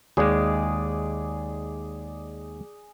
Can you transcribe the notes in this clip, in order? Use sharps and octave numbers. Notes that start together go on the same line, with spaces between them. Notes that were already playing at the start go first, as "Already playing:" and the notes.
D#2 G#3 G#4 D5